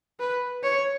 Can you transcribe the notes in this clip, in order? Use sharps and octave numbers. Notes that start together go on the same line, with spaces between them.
B4
C#5